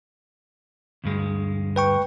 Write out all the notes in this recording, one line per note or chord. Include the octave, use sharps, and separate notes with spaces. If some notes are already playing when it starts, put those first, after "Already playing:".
D2 G2 G#3
B4 G5 C#6